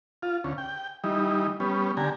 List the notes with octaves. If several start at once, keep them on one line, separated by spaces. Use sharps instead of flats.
F4
D2 C#4
G5
E3 G3 D#4
G3 B3 C#4
D3 G4 G#5 A#5